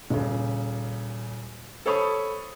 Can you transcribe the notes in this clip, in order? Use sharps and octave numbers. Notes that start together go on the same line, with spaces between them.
D#1 C#3
A4 C5 C#5 B5 C#6 D#6